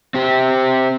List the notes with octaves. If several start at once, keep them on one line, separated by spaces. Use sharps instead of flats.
C4 G4